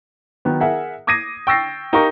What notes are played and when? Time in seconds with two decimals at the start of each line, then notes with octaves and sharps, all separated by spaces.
0.45 D#3 F#3 B3
0.60 G#4 A#4 E5 F#5
1.07 D6 D#6 G#6 A#6 C7 D#7
1.47 G5 C#6 E6 A6 A#6 C7
1.93 D#4 G4 A#4 F5 A#5 C#6